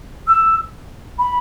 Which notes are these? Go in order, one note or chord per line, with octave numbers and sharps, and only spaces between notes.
E6
B5